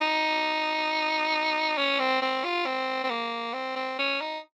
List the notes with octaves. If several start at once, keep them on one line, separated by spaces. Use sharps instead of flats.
D#4
C#4
C4
C4
F4
C4
C4
A#3
C4
C4
C#4
D#4